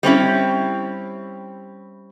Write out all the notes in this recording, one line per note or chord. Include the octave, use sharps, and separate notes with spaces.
G3 C4 C#4 E4